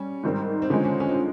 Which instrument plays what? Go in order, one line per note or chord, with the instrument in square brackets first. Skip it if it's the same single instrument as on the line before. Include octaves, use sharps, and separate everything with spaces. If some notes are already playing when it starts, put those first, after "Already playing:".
Already playing: [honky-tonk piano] G3 [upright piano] C#4
[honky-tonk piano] G#2 D#3 G3 C4
[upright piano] C4
[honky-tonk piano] D3 F3 G#3 [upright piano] C#4
[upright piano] C#4
C#4
C4